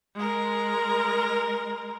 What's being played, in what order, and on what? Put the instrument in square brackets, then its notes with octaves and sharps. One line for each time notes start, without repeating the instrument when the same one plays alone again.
[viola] G#3 A#4